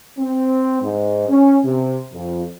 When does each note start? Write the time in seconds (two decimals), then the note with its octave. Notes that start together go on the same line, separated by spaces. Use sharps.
0.19 C4
0.82 G#2
1.29 C#4
1.64 C3
2.13 F2